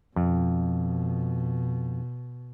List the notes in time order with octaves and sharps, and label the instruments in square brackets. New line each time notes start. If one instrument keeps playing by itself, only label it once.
[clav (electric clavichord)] F2 [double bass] B2